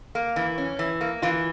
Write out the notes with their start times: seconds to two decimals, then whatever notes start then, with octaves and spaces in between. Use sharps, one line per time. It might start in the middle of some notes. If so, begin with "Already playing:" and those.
0.15 A#3
0.36 E3
0.58 C#4
0.79 E3
1.01 A#3
1.22 E3 F4